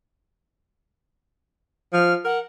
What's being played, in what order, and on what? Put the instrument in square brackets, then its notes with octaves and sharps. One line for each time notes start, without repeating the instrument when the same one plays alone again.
[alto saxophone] F3 [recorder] F6
[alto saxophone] A#4 [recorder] F#5